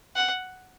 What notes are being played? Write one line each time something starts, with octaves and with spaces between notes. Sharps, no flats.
F#5